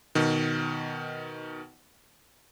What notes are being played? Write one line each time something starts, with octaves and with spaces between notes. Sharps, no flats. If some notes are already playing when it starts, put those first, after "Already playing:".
B2 D#3